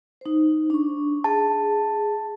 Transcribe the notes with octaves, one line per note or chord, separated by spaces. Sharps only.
D#4 C5
D4 C#6
G#4 A5